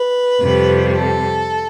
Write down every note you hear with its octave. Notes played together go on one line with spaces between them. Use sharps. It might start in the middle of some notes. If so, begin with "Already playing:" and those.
Already playing: B4
F2 C3 G3
A4